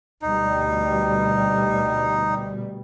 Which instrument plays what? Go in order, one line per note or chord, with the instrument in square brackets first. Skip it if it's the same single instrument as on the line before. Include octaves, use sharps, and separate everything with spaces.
[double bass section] D2 B2 G3 [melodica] D#4